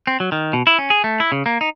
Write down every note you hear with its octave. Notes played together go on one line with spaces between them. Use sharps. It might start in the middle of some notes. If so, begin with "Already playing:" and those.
C4
F#3
D#3
B2
E4
C#4
G#4
A3
E4
C#3
A#3
D#4